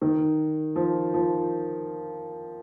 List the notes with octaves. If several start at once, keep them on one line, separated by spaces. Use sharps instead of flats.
D#3
F3
F3